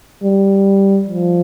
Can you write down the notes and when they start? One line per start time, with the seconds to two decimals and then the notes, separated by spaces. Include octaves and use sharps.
0.23 G3
1.08 F3